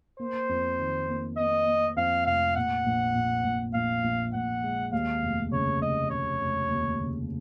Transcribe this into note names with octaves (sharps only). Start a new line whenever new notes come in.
A#3 C5
F2
D#3
A#3
A#3 D#5
A#3
F2 F5
F1 F5
A#2 F#5
A#1
A#2
A#1
A#1 F5
A#1
A#1 F#5
G#3
D#2 F5
F1
C#3 C#5
F1 D#5
C#3 C#5
F1
D#2
C#3